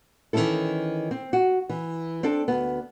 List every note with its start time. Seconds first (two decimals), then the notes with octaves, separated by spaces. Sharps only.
0.33 D#3 E3 A3 C#4 E4 A4
1.11 C4
1.33 F#4
1.69 E3
2.23 C4 D4 A4
2.48 D2 B3